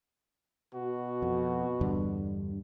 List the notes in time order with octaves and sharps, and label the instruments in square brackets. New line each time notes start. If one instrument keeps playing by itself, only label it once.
[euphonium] B2 [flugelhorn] F#4
[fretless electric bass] F2
[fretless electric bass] E2 D3 D4 [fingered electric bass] G2